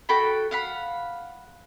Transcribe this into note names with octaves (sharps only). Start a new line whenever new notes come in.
F#4 A4 G5 B5
F5 F#5 B5